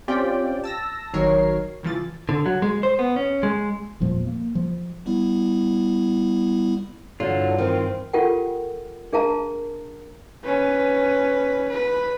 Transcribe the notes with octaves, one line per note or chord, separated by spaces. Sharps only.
C4 C#4 F4 G4 D5 G5
A5 E6 A#6
G#1 D#3 F#3 A#4 C#5 C7
C#2 E3 F3 A6
D3
F#3
G#3
C5
B3
C#4
G#3
E1 A#2 F3 A#3
A#3
F3
G3 B3 E4
G2 D3 E3 F#3 F4
D#3 C4
F4 G4 A4 A#4 F#5 G5
D4 G#4 A#4 F5 A5 A#5
C#4 B4
B4